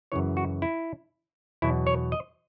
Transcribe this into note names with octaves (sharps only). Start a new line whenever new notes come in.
F#2 C#3 E3 C#5
F#4
E4
E2 B2 F#3 E4
C#5
D#5